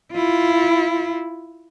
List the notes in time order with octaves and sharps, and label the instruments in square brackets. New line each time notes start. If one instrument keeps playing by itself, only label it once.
[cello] E4 F4